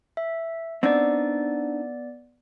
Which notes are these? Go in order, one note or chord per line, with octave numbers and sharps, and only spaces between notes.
E5
B3 C4 D4 D#4 D5